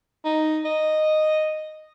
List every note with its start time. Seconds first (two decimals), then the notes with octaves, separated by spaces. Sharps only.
0.25 D#4
0.65 D#5